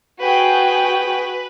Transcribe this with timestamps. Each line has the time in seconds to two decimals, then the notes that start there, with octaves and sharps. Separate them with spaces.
0.20 F#4 G#4 B4 G5